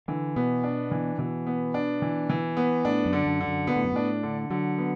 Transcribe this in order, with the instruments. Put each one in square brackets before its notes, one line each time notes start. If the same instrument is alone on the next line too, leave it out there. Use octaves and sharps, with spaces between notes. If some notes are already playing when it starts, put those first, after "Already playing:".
[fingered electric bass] D3 [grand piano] E3
[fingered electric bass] B2 [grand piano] B3
[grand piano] D4
E3
[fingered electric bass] B2 [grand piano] E3
[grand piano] B3
D4
E3
E3
B3
[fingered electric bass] A2 [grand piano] D4
[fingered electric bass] F#2
[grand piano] D3
[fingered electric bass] F#2
[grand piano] D3
[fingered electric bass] F#2
[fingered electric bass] B2 [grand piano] B3
[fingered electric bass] A2
F#2
[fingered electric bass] A2 [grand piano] D4
[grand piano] D3
[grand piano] D3 [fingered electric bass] F#3
[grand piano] B3